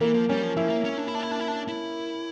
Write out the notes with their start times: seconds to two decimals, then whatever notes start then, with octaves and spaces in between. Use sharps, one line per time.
0.01 E3 A#3
0.14 F3
0.29 G3 C#4
0.42 F3
0.57 F3 E4
0.70 A#3
0.85 C#4
0.98 D4
1.07 E4
1.15 D4
1.23 E4
1.31 D4
1.40 E4
1.48 D4
1.68 E4